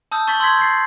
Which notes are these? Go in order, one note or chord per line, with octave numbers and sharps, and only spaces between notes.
A5 D#6 E6 G6
A5 C#6 G6 A6 B6 F#7
C6 E6 G6 G#6 B6
G6 A6 B6 C7
C7